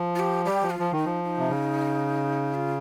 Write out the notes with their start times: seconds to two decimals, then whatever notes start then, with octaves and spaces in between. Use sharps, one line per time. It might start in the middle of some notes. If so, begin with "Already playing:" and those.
Already playing: F3
0.15 F4
0.19 G4
0.45 G3 G4
0.63 F3
0.71 F4
0.79 F3
0.92 D#3 D#4
1.05 F3
1.24 D#4
1.38 C3
1.49 C#3
2.55 F4